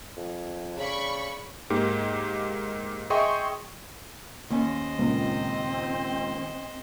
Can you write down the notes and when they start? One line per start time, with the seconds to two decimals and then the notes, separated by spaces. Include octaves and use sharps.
0.17 F2
0.77 C#3 D5 B5 C#6
1.70 G#2 A#3 G4
3.10 G#4 D#5 E5 G5 C6 C#6
4.50 D#2 C#4 C5 D#5
4.99 C#2 A#2 C4